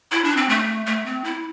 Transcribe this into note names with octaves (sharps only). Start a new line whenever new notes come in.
E4
D4
C4
A3
A3
C4
E4